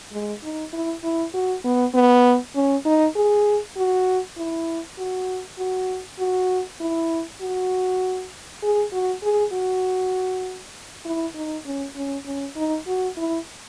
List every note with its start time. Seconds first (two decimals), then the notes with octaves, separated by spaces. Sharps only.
0.13 G#3
0.43 D#4
0.73 E4
1.04 E4
1.34 F#4
1.64 B3
1.94 B3
2.55 C#4
2.86 D#4
3.16 G#4
3.77 F#4
4.37 E4
4.98 F#4
5.59 F#4
6.19 F#4
6.80 E4
7.41 F#4
8.62 G#4
8.92 F#4
9.23 G#4
9.53 F#4
11.05 E4
11.35 D#4
11.66 C#4
11.96 C#4
12.26 C#4
12.56 D#4
12.87 F#4
13.17 E4